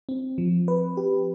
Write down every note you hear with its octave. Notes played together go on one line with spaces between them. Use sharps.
C4
F3
B4
G4